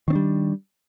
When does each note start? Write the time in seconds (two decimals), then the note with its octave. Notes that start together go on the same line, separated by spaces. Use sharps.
0.08 D#3
0.10 C4
0.13 D4
0.15 G3